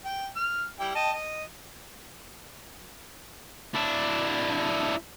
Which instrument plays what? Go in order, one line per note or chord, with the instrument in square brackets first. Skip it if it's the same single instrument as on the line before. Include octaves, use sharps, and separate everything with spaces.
[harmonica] G5
F6
G3 E4 G5
D#5 G5 A5
D#5
[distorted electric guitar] D4 E4